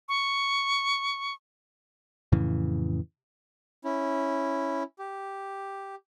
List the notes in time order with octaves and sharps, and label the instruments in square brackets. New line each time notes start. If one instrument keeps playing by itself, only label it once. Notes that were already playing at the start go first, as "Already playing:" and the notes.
[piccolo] C#6
[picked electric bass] F2 A2 C#3 E3
[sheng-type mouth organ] C#4 E4
G4